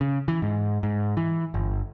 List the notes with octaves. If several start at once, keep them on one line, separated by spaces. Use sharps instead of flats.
C#3
E3
G#2
G#2
E3
G1